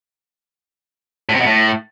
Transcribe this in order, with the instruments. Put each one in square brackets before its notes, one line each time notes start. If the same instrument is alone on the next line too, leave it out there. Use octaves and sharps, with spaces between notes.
[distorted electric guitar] A2
C3
B2
A2